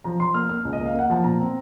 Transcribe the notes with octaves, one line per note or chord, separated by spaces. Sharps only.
F3 A#5
F3 C6
A#3 F6
A#3 F6
C#2
D#5
A#3
F5
A#3 F#5
F3 A5
A#2 A#5
C4